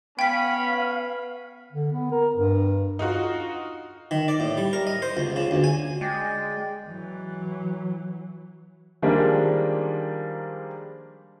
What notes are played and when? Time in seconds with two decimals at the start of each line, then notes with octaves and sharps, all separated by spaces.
0.19 B3 C#4 C#5 F5 G5 B5 B6
1.73 D3
1.92 B3
2.11 A#4
2.36 G2
2.99 D#4 F4 F#4
4.11 D#3
4.28 D5
4.40 A2
4.57 G3
4.73 A#4
4.87 D#5
5.02 C5
5.17 C#2
5.36 C#3
5.51 D2
5.64 G#5
6.01 G#3 D5 G5
6.87 E3 F#3
9.02 D#3 F3 G3 G#3 A#3 D4